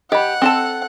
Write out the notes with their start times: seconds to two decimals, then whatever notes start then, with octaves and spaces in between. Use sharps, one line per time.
0.12 G4 D#5 F#5 B5
0.42 C4 A4 A5